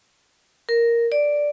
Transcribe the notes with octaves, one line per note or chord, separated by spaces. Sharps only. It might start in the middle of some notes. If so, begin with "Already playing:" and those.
A#4
D5